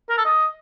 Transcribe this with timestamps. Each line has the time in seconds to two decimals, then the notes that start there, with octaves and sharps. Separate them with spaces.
0.10 A#4
0.17 A4
0.25 D#5